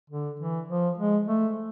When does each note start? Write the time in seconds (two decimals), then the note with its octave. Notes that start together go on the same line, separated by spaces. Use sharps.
0.10 D3
0.40 E3
0.69 F3
0.98 G#3
1.28 A3